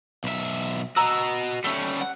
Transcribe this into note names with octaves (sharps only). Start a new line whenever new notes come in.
B1 E5
F#4 D#5 A#5 E6
G3 A3 C#4
F#5